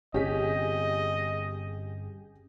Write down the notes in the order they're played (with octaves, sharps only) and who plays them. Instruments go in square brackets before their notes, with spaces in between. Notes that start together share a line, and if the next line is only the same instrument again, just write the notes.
[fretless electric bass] G1 C3 [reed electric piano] C#4 [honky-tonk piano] G4 G#4 B6 [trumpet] D#5